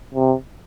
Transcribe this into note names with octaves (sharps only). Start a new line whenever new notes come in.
C3